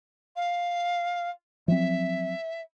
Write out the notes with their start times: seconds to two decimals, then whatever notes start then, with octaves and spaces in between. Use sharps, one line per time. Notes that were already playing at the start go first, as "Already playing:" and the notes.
0.36 F5
1.68 F3 F#3 C4 E5